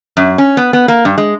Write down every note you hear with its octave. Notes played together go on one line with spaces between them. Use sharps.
F#2
C#4
B3
B3
A#3
G2
G#3